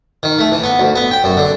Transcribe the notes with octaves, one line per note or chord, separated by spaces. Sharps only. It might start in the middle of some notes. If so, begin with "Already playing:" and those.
D#3
A3
E3
B3
D2
B3
G5
F#2
D3